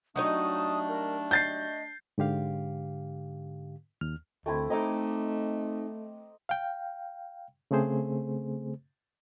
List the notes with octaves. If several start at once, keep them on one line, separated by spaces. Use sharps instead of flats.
F#3 G3 A3 D4 D#4 C#5 D#6
A#4
D#5 G6 A6 C7
G#2 D3 G4 F5
D#2 F6
D2 A3 C4 E4
A3 C4 D#4 D#5 A#5 D6
F5 G5
C#3 A3 C4 G#4 C5